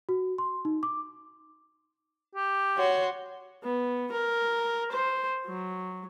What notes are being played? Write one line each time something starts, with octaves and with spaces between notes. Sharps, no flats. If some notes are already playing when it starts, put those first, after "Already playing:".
F#4
C6
D#4
D6
G4
F#4 C#5 C6
B3
A#4
C5
F#3